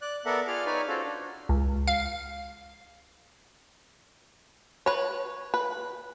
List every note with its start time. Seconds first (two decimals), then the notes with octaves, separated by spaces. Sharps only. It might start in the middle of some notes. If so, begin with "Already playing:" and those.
0.01 D5 F#6
0.26 B3 A4 A#4 D5 E5 F#5
0.47 F4 G#4 D5 F5 F6
0.66 D#4 B4 C#5 D5 G#5
0.88 C#4 F4 F#4 A4 C5
1.03 D4
1.49 C#2
1.87 F5
4.86 B4 C#5
5.54 B4